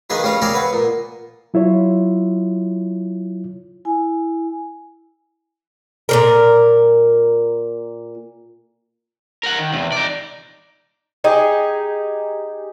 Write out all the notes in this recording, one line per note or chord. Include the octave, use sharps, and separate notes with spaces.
D#3 F3 D4 G#4 B4
G3 C#4 F4 F5
C4 C#4 G#4 A#4 C#5 D5
B4 F#5
A#2
F#3 E4 F4 C#5
E4 G#5
A#2 C#3 A#4
A#4 F#5
D#3
E2 C3
D#4 D5
D#4 G4 G#4